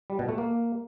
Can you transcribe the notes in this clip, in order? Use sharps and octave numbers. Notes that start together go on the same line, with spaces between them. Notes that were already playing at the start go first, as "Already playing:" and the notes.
G3
B2
A3
A#3